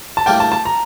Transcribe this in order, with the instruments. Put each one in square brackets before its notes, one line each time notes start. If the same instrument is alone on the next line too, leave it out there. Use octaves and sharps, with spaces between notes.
[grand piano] A5
[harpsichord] A2 G3 A#3 D4 [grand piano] G5
[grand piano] A5
A5
A#5